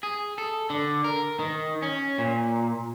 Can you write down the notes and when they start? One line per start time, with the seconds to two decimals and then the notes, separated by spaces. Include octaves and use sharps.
0.03 G#4
0.38 A4
0.70 D3
1.04 A#4
1.39 D#3
1.82 C#4
2.18 A#2